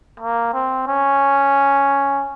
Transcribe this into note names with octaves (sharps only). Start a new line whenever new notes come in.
A#3
C4
C#4